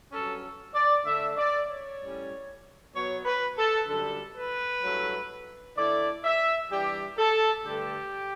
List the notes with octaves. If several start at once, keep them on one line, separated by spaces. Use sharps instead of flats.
G2 F#3 C#4 A4
D5
D3 A3 D4 E5
D5
C#5
A2 G3 C#4
B2 F#3 B3 C#5
B4
A4
F#2 D3 G3 A4
B4
G2 F#3 A3 E4
D3 A3 E4 D5
E5
E3 G3 D4 G4
A4
G2 D3 A3 D4 G4